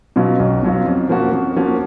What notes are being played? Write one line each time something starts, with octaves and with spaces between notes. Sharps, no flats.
B2 F#3 C#4 F4
B1
B2 F#3 C#4 F4
F2
F3 A#3 C#4 F#4
F2
F3 A#3 C#4 F#4